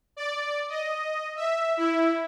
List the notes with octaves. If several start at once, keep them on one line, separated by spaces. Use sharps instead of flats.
D5
D#5
E5
E4